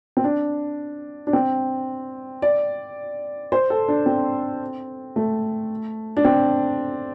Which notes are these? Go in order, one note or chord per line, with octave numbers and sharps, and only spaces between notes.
C4
D4
D4
C4
D5
C5
A4
D4
C4
A3
D4
C4